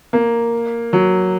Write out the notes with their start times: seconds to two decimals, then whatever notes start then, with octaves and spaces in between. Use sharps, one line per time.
0.13 A#3
0.93 F#3